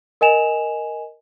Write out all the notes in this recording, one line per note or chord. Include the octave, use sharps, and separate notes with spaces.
A#4 D#5 G#5 E7 F7